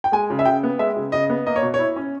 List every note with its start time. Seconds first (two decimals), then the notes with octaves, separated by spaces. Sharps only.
0.04 G5
0.12 G#3 G#5
0.30 C#3
0.39 E5
0.45 C#3 G5
0.63 B3
0.79 G#3 E5
0.96 C#3
1.12 C#3 D#5
1.29 B3
1.46 A#3 D#5
1.56 C#5
1.62 B2
1.74 C#5
1.79 E4
1.96 C#4